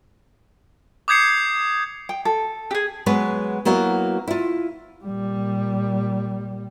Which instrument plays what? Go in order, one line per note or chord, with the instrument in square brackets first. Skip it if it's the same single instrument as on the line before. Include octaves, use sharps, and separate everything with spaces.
[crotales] D6 D#6 G6 G#6 C7 C#7
[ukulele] G5
A4
[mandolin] G4 G#4
[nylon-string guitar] F#3 G#3 B3 B4
F#3 A#3 B3 E4 F#4
E4 F4
[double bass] A#2 G3